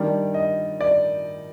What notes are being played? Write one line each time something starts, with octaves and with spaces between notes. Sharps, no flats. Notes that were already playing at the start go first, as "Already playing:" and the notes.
Already playing: D#3 G3 D4 D5
D#5
D5